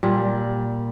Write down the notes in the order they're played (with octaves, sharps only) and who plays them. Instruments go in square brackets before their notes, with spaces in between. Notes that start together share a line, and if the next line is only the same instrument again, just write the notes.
[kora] A#2 G3